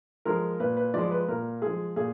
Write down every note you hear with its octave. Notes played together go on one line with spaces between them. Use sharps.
F3 G#3 A#4
A#2 B4
B4
F3 G#3 D5
B4
A#2 A#4
F3 G#3 G#4
A#2 G#4